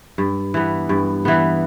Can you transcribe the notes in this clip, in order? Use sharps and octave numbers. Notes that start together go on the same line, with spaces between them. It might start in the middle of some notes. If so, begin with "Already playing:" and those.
G2
E3 B3
G2
E3 B3